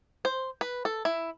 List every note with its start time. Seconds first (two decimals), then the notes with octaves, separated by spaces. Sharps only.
0.25 C5
0.61 B4
0.85 A4
1.05 E4